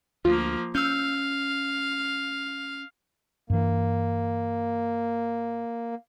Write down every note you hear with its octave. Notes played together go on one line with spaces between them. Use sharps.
D2 F3 A#3 F4
C#4 F5 E6 G6
G2 E3 A#3